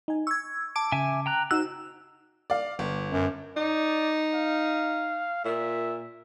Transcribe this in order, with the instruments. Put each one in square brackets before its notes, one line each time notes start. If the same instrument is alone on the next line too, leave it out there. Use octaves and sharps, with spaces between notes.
[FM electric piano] D#4 G#5
[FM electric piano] C#6 [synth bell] E6 G#6
[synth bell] A5 D6 D7
[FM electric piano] C#3 [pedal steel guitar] E5 G#5
[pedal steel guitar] G5 A#5 F#6
[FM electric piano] D#4 F#4 A#5 [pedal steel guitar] C5 F#6 [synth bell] E6
[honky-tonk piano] D5 F5
G1
[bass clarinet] F#2
[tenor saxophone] D#4 [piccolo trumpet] D5
[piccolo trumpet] F5
[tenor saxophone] A#2 [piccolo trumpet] E5